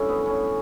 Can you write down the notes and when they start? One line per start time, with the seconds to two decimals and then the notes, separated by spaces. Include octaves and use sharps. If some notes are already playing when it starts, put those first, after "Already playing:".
Already playing: G2 D3 F#3 C#4 E4 A4
0.09 B3
0.26 C#4